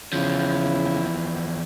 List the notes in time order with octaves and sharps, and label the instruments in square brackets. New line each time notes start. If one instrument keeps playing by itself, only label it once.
[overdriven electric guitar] E2 F3 [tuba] C#3 [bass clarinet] E4